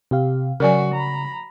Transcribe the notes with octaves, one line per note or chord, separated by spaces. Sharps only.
C3 G4 F5
C#3 F#3 F#4 A#4 D5 G#5
A#5 B5